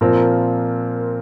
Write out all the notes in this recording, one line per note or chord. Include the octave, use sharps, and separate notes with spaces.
A#2 F3 C4 F4 A#4